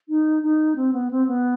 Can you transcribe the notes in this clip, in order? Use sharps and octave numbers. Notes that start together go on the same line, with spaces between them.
D#4
D#4
C4
B3
C4
B3